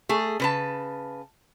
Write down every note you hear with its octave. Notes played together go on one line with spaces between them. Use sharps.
A3 G#4
C#3 B4 A5